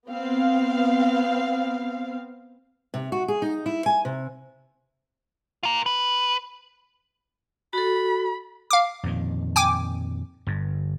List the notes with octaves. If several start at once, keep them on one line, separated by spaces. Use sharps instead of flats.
B3 C4 F5
C3
F#4
G#4
D#4
E4
G#5
C3
F4 A#4
B4
F#4 A4 B5
F5 D6
F2 A#2 D#3
G5 G#5 D6
G1 G2